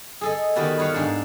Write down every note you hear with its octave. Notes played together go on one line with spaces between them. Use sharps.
G#4 A4 D#5
D#3 B3 F#4 G4 D5
B4 C#5 F5
G#2 D4 D5